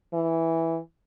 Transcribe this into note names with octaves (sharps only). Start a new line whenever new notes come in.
E3